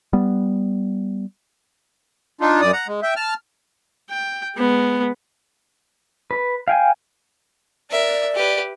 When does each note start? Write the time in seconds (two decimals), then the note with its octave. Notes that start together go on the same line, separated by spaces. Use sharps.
0.13 G3 B3
2.41 D4 D#4 F4
2.61 F#2 D5 D#6
2.73 F#5 A#5
2.88 G#3
3.02 E5 G5
3.16 A5 F6
4.10 G5
4.56 G#3 B3
6.31 B4
6.68 F5 G5 G#5
7.91 A#4 D5 E5
8.35 G4 B4